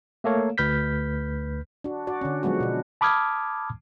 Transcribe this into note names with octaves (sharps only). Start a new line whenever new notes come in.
A3 A#3 A4 C#5 F5
D2 B4 F6 G6 B6
D4 F#4
F#4 D5
D3 C#4
F3 F#3 G#3 B3 F#4
B2 D4
A5 B5 D6 D#6 F6 G#6